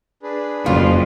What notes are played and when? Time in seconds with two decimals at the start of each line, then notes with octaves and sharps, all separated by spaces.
0.23 D4 G#4 B4
0.66 F#1 F2 F4